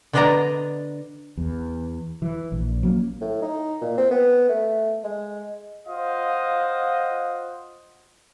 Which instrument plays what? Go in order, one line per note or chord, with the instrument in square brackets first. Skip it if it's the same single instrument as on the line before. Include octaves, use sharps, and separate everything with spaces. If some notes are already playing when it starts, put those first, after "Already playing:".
[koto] D3 B3 D4 D5 D#5 A#5
[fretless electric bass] E2
E3
A#1
F#3 A#3 B3 C#4
[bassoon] A2
D#4
A#2
C4
B3
A3
G#3
[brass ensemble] F4 C5 D#5 F5 F#5